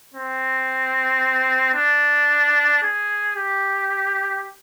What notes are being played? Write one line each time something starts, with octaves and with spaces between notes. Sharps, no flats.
C4
D4
G#4
G4